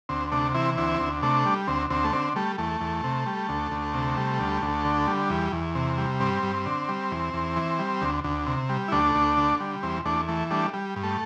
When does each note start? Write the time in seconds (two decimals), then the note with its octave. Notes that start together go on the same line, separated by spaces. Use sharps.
0.09 D2 C4
0.31 C3 A3 D4
0.54 E3 C4 E4
0.77 D2 C4 E4
1.00 D2
1.22 C3 A3 D4
1.45 G3
1.67 D2 C4
1.90 D2 C4
2.04 A3
2.13 D3 C4
2.36 G3 A3
2.58 E2 A3
2.81 E2
3.04 C3
3.26 G3
3.49 D2
3.71 D2
3.94 C3
4.17 G3
4.40 D2
4.62 D2
4.85 D3
5.07 G3
5.30 E2
5.52 E2
5.75 C3
5.98 G3
6.20 G2 C4
6.43 G2
6.66 D3
6.88 G3
7.11 E2
7.34 E2
7.56 E3
7.79 G3
8.02 D2
8.24 D2
8.47 C3
8.69 G3
8.88 E4
8.92 D2 A3 D4
9.15 D2
9.37 D3
9.60 G3
9.83 E2 C4
10.05 E2 A3 D4
10.28 E3 A3
10.50 G3 A3 D4
10.73 G3
10.96 G2
11.03 A3